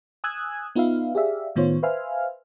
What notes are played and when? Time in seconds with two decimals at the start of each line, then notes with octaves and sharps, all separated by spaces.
0.24 G#5 D#6 E6 F#6 G#6
0.76 B3 D#4 F4 B4 E5 F5
1.15 G4 G#4 D5 E5 F5
1.56 A2 D#3 B3 F4 C5 C#5
1.83 B4 C5 E5 F5 G#5 F6